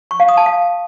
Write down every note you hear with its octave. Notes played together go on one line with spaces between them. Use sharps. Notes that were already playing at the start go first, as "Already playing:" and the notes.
C#6
F5
D#6
A5
F5